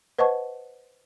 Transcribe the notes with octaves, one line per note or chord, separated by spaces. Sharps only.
B4 C5 D#5 F#5 A5 C#6